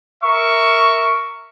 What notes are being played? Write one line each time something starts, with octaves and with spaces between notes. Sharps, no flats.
A#4 E5 C#6